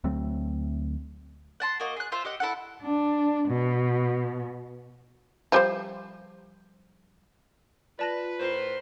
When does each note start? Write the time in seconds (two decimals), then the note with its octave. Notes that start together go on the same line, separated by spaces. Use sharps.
0.04 D2 F#3 A3 C4
1.60 F#5 A5 C6
1.80 A#3 F#4 D#5
1.96 G#4 F#6
2.12 F4 C5 E5
2.25 G4 D#5 F#5
2.40 E4 A4 F#5
2.82 D4
3.48 B2
5.52 F3 G3 C5
7.99 F4 B4 D5 A5 A#6
8.40 A2 A#4 C5